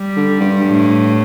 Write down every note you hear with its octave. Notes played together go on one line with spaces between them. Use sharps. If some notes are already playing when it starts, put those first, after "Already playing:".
Already playing: G3
D3
G2
A2